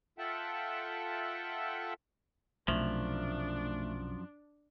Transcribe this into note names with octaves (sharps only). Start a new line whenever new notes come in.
F4 A4 E5 F#5 G5 A5
B1 F#2 C3 F3 A3 D4